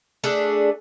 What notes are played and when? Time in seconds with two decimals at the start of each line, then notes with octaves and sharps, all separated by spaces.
0.24 A3 D4 G#4